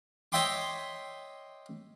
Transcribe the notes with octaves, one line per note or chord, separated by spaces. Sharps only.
C#5 D#5 E5 G5 C6 D6